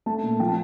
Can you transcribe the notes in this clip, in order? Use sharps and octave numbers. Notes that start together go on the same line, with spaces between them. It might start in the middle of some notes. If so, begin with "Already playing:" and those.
A3 A5
A#2
F3 G5
A5